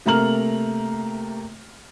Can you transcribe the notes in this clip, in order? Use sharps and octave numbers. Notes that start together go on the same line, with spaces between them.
C3 A3 A#3 A#5 F6 F#7